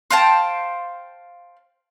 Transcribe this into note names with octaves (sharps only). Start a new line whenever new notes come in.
C5 F5 G5 A5